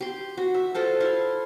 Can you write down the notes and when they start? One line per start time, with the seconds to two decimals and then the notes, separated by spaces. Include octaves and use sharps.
0.01 G4 C6
0.37 F#4
0.54 E5
0.74 F4 A4 C5 A5
1.00 E4 F5 C6